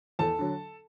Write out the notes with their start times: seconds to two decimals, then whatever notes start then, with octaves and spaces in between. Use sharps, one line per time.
0.19 E2 A4 A5
0.39 D3 F#3